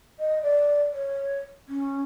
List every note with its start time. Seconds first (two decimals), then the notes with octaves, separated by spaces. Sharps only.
0.19 D#5
0.42 D5
0.93 C#5
1.68 C#4